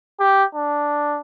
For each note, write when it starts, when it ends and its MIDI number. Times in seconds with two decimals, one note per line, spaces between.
0.20 0.44 67
0.55 1.20 62